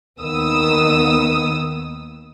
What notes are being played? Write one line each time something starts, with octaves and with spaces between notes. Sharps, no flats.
D#2 D#3 A#3 B3 D#6 E6